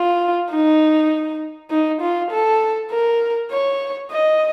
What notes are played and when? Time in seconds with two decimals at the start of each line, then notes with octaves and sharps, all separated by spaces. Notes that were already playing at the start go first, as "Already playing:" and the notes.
Already playing: F4
0.51 D#4
1.70 D#4
2.01 F4
2.31 A4
2.91 A#4
3.51 C#5
4.11 D#5